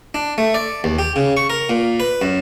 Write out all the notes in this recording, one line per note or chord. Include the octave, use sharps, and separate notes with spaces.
D4
A3
D5
D#2
G4
C#3
C#6
A#4
A#2
B4
F#2